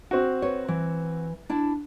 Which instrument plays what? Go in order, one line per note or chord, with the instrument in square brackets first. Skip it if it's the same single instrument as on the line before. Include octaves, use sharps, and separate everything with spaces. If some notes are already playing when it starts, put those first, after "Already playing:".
[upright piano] C4 F#4
[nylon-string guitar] B4 C#5
E3
D4 E4 A5